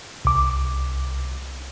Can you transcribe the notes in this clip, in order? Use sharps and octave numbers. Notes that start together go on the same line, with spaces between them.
C2 D6